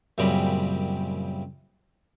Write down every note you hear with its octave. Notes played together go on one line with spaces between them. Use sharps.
F#2 A#2 C#3 G3 C4 B5